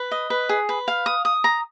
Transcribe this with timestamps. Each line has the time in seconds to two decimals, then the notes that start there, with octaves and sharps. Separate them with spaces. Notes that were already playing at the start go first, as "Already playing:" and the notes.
Already playing: B4
0.11 D#5
0.30 B4
0.49 G#4
0.69 B4
0.88 F5
1.06 D#6
1.25 D#6
1.44 A#5